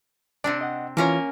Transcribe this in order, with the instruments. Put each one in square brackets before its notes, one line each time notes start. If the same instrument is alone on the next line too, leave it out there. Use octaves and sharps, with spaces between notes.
[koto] C3 C4 D4 [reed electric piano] D5
[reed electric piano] D#5 F#5
[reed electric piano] E3 F4 C#5 [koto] A#3 C#4 A#4